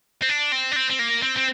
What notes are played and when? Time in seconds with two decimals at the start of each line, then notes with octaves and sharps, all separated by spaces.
0.23 C4
0.29 D4
0.52 C4
0.72 D4
0.76 C4
0.90 C4
0.99 A#3
1.22 C4
1.37 C4